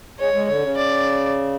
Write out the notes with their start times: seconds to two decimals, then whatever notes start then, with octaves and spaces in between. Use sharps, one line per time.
0.19 G#3 C#5
0.34 G#3
0.48 D3 C#5
0.62 C#3
0.77 D5